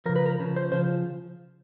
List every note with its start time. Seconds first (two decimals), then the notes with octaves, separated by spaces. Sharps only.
0.06 C#3 F3 A#4
0.16 B4
0.26 A#4
0.40 C#3 F3
0.56 C5
0.72 C#3 F3 C5